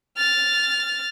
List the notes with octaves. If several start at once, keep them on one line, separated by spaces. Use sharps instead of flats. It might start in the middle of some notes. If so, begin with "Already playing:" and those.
F6 A6